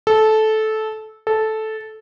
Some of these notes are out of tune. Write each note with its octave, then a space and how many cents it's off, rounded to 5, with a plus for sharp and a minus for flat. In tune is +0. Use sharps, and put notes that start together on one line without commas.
A4 -15
A4 -10